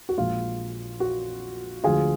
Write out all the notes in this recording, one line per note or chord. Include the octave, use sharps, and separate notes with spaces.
F#4
A#1 A#2 G#3 F4
F#4
D2 D3 F3 G#3 F4 G#4